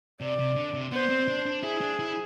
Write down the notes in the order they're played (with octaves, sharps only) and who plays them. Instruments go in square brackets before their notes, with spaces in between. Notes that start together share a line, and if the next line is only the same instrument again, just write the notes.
[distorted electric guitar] C3 [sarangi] D5
[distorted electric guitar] C3
D3
C3
[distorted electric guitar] B3 [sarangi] C5
[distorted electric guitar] C4
D4
D4
[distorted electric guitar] E4 [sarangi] G#4
[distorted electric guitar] D4
E4